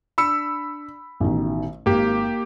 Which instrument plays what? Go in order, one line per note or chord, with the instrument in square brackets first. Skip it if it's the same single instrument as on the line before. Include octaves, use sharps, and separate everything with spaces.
[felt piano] D4 [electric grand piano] B5 E6 C#7
[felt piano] A1 B2 D#3
[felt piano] G#1 [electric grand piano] A#3 G4